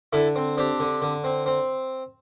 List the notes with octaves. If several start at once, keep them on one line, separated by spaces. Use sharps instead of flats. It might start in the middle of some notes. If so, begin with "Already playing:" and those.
D3 E4 A4
C4
C4 D4 G4
D3
D3
C4
C4